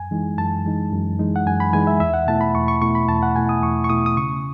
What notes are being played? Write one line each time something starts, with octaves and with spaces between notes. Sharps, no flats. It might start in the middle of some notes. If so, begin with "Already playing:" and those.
Already playing: F#2 G#5
E3 G#3 D#4
F#2 A5
E3 G#3 D#4
F#2
E3 G#3 D#4
F#5
F#2 G#5
B5
E3 G#3 D#4 G#5
E5
E2 E5
F#5
B2 A3 E4 A5
B5
E2 C#6
C#6
B2 A3 E4 C#6
B5
E2 A5
F#5
B2 A3 E4 G#5
D#6
E2 C#6
C#6
B2 A3 E4 D#6
D#6
C#3 C#6